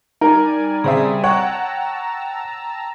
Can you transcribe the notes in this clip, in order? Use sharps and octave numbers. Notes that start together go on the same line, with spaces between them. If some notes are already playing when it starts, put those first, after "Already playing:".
G3 D#4 A#4 D5 G#5
C#3 C4 E5 D#6
C#5 F#5 G5 A5 A#5 E6